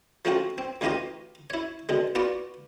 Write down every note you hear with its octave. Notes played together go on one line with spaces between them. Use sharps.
F3 A3 C4 C#4 F4 F#4
C4
D2 E3 C#4 F4 G4 D#5
E4 C#5
B2 D3 G#3
B3 F4 F#4 D5